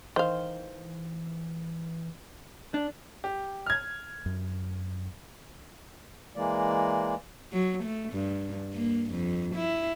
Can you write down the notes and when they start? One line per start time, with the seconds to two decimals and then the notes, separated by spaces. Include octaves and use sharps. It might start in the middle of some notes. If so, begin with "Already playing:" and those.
0.16 D#3 E3 C5 F5
2.74 D4
3.24 G4
3.66 F6 G#6
4.26 F#2
6.36 E3 G#3 A#3 D5
7.52 F#3
7.84 A3
8.13 G2
8.74 A#3
9.11 F2
9.55 E4